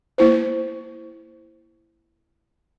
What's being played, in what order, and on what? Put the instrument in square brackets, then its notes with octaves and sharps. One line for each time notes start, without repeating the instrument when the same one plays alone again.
[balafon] A#3 E4 C5